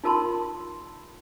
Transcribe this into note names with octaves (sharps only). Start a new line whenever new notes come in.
D#4 F4 A#4 A5 B5 C6